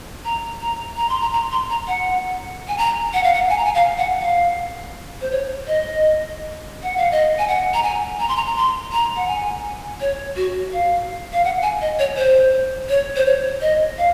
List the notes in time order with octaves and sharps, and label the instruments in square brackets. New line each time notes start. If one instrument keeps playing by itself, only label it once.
[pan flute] A#5
A#5
A#5
C6
A#5
A#5
C6
A#5
F#5
G#5
A#5
F#5
F5
F#5
G#5
A#5
G#5
F5
F#5
F5
C5
C#5
D#5
F#5
F5
D#5
G#5
F#5
A#5
G#5
A#5
C6
A#5
A#5
C6
A#5
F#5
G#5
C#5
F#4
F5
F5
F#5
G#5
D#5
C#5
C5
C#5
C5
C#5
D#5
F5